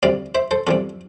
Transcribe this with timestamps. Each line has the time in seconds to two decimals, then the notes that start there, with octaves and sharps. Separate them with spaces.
0.03 D2 C3 G3 D5 F5
0.35 C5 E5
0.51 A4 C5
0.67 E2 C3 G3 F4 A4